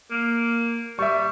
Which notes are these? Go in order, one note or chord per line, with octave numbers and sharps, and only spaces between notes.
A#3
G3 E5 C#6